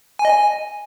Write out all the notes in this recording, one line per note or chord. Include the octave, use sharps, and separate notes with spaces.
G#5
D#5
G#5